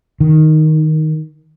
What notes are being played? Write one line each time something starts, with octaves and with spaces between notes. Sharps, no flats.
D#3